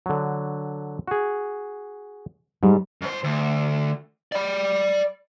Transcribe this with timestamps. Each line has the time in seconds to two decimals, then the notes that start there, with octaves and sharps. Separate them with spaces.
0.06 D3 F#3
1.07 F#4 G#4
2.63 G#2 G3
3.02 F#2 C5
3.24 D2
4.32 D5 B5